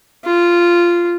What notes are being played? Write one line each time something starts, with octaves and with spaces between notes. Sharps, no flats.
F4